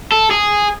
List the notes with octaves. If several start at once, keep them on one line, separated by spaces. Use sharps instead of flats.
A4
G#4